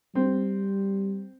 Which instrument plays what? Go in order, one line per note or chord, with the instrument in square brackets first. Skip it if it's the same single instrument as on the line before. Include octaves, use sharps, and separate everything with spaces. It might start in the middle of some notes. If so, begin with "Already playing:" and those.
[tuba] G3 [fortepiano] C4